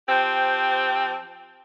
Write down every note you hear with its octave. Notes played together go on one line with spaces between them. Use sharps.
F3 C4 G4